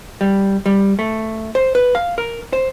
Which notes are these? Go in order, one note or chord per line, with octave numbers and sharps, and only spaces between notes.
G3
G3
A3
C5
B4
F5
A#4
C5